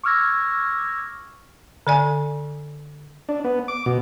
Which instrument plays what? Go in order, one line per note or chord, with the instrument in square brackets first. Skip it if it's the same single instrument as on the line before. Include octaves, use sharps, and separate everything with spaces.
[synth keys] C#6 D6 E6 F6 G#6 A#6
[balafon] D3 D5 G#5
[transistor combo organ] D4
B3
D6
B2